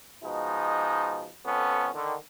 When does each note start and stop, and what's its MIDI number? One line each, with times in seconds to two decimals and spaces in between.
0.24 1.31 47
0.24 1.31 53
0.24 1.31 56
0.24 1.31 63
1.46 1.89 41
1.46 1.89 59
1.46 1.89 61
1.46 1.89 69
1.93 2.14 50
1.93 2.14 51